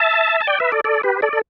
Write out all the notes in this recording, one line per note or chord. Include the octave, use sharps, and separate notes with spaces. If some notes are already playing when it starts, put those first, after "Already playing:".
Already playing: E5 A5
A5
D5 G5
B4 E5
A4 D5
A4 D5
G4 B4
A4 D5
A4